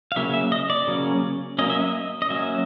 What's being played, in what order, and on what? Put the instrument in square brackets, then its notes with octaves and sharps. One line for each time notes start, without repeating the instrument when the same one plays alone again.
[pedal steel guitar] F5
C#3 F#3 A#3 C#4 E5
E5
D#5
D5
C#3 F#3 A#3 C#4
F#3 A#3 C#4 D#5
E5
D#5
D#5
F#3 A#3 C#4 E5